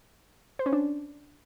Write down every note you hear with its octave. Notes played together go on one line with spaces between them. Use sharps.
C5
C#4
D4